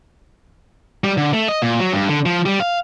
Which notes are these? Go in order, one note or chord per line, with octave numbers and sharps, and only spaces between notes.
G3
D3
A3
D#5
A#2
F#3
G2
D3
F3
G3
F5